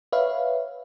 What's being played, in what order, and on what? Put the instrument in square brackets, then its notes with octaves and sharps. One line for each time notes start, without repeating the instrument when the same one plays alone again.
[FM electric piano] B4 C#5 E5 F5